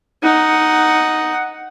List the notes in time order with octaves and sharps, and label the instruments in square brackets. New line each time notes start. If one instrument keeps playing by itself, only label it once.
[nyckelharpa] D#4 F#5